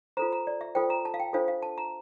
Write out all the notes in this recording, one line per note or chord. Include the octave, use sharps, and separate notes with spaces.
F4 A4 C5 A#5
A#5
D5
E5
F4 A4 C5 G5
A#5
A5
F5
G5
D4 F4 A4 C5 F5
F5
A5
A#5